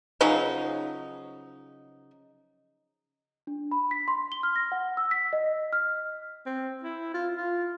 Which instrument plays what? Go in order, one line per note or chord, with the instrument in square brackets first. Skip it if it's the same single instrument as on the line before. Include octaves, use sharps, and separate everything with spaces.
[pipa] C#3 F3 F#3 D#4
[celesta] D4
B5
B6
C6
G7
F6
A#6
F#5
E6
B6
D#5
F6
[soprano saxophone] C4
E4
F4
F4